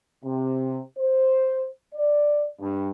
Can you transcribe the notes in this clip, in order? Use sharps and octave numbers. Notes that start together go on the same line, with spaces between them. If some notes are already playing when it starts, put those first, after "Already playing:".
C3
C5
D5
G2